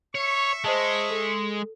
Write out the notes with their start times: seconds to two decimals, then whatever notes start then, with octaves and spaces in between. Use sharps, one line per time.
0.15 C#5 E5 C#6
0.65 G#3 C5 D#5 A5
1.10 A4